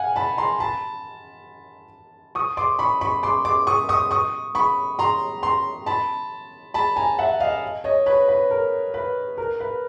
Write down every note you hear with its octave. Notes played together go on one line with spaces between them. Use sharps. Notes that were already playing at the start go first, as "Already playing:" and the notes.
Already playing: F5 F#5 G#5
A5 B5
A#5 C6
A5 B5
C#6 D#6
C6 D6
B5 C#6
B5 C#6
C6 D6
C6 D6
C#6 D#6
C#6 D#6
C#6 D#6
B5 C#6
A#5 C6
A#5 C6
A5 B5
A5 B5
G#5 A#5
E5 F#5
D#5 F5
C#5 D#5
B4 C#5
B4
A#4
B4
A#4
B4